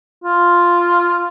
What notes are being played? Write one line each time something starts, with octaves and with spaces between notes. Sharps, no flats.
F4